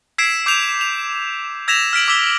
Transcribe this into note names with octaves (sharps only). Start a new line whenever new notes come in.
E6 G#6 B6 C7 D7 E7
D6 G6 C7 F7
F7
E6 G#6 A#6 B6 E7 F7
F6 B6 D7 F#7
D6 E6 B6 G7